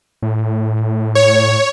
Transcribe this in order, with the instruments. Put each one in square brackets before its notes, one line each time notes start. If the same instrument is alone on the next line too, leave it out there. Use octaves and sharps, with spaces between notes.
[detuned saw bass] A2
[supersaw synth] C#5